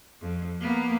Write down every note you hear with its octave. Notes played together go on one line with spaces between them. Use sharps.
F2
A#3 B3